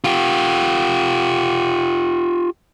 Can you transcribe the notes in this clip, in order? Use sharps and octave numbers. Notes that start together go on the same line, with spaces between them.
F4 G4